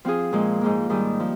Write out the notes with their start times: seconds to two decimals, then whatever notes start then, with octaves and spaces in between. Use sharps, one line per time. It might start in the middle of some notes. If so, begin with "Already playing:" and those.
0.05 F3 C4 F4 G#4
0.33 A#2 F3 G#3
0.61 G#2 F3 A#3
0.90 G#2 D#3 G3
1.20 F3